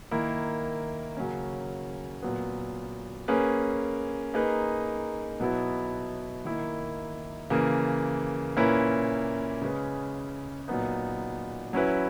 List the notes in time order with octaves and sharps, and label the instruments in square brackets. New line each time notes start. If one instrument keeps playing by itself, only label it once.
[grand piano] D#3 A#3 E4
C#3 F#3 A#3 C#4
A#2 F#3 B3
A#3 C#4 G#4 B4
A#3 D#4 G#4 B4
B2 F#3 B3 E4
D#3 A#3 E4
C#3 E3 A#3
A#2 A#3 C#4 E4 B4
C#3 G#3 C#4 G#4 B4
A#2 F#3 B3 D#4
F#3 C#4 E4 B4